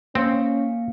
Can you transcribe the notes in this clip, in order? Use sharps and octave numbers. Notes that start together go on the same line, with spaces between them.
A#3 C4 C#4 F5 C#7